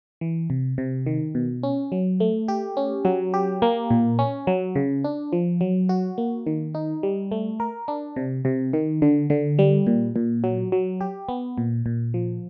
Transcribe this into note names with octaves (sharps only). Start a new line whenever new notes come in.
E3
C3
C3
D#3
B2
C#4
F#3
A3
G4
C#4
F#3
G4
A#3
A#2
C#4
F#3
C#3
D4
F3
F#3
F#4
A#3
D#3
D#4
G3
A3
A#4
D4
C3
C3
D#3
D3
D3
G3
A#2
A#2
F#3
F#3
G4
B3
A#2
A#2
F3